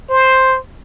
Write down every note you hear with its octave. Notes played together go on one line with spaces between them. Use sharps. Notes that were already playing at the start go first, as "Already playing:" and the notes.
C5